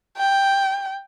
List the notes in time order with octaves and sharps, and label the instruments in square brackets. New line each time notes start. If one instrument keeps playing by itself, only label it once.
[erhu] G5